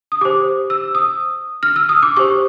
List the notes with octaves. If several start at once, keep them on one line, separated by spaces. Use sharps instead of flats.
D#6
G4 C5 D6
E6
D#6
F6
E6
D#6
D6
G4 C5 C#6